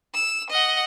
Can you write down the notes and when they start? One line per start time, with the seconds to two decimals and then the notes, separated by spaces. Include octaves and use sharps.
0.14 E6
0.50 D#5 F#5